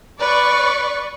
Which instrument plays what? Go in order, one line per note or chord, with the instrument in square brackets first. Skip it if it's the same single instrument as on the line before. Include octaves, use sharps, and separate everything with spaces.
[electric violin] B4 [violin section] D5 C#6